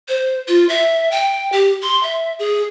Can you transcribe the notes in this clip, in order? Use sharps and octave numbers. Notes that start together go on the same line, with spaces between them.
C5
F4
E5
G5
G4
C6
E5
G#4